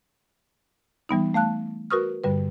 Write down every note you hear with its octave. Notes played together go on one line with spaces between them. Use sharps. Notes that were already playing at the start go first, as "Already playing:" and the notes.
E3 G3 B3 D#4
A3 F5 A5 F#6
F#4 A#4 B4 C#6 D#6 F6
G2 D3 G3 B4